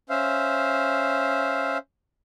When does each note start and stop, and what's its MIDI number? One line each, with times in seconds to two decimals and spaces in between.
0.10 1.78 61
0.10 1.78 72
0.10 1.78 76
0.10 1.78 77